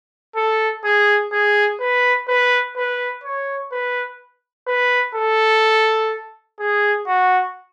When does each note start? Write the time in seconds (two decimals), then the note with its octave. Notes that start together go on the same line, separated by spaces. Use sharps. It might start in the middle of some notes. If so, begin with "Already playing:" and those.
0.36 A4
0.84 G#4
1.32 G#4
1.80 B4
2.28 B4
2.76 B4
3.24 C#5
3.72 B4
4.67 B4
5.15 A4
6.60 G#4
7.07 F#4